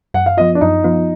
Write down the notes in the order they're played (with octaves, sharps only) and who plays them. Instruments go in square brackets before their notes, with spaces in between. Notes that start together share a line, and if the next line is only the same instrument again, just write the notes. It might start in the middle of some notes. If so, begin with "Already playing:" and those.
[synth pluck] F#2 [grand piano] F#5
[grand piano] F5
[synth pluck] F3 B3 F4 [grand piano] D#5
[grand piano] D4
[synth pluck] F#2 [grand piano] D#4
[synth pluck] F3 B3 F4